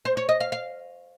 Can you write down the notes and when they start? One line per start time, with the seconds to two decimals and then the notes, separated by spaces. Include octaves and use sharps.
0.05 C5
0.17 C#5
0.29 D#5
0.40 F5
0.52 F5